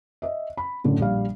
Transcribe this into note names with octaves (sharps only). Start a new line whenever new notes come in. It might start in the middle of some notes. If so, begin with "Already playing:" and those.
D#5 E5
B5
F#2 A2 D3
A#1 G3 F5